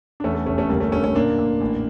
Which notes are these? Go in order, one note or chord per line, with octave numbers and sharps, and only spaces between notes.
D4
E2 A3 C#4
A3
F1 A3 C#4
A3 C#4
D2 G3 A#3
A3 C#4
D3 A3 C#4
A3 C#4
A#2 A#3 D4
A#2
A1